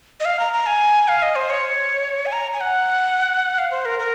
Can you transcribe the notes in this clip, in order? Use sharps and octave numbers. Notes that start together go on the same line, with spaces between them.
D#5
F5
A#5
A#5
G#5
F5
D#5
C5
C#5
G#5
A#5
G#5
F#5
F5
C5
A#4
A#4